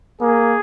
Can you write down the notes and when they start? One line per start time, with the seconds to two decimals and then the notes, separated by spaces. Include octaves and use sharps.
0.21 A#3 G#4